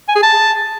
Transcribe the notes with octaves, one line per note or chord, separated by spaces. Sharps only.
G#5
G#4
A5